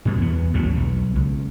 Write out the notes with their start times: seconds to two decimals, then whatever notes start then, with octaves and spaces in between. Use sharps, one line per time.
0.05 G2 B2
0.18 E2 B3
0.54 A1 D#2 G#2 F#3
0.77 B1
1.15 C#2